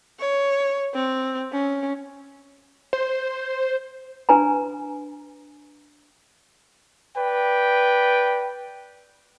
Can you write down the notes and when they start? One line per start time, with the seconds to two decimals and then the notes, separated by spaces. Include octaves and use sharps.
0.20 C#5
0.94 C4
1.52 C#4
2.93 C5
4.29 D4 B4 G#5 A#5
7.16 B4 D5 G5